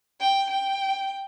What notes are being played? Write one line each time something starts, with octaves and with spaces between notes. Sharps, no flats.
G5
G5